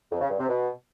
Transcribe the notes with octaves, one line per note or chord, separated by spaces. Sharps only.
F2
C#3
G2
C3
B2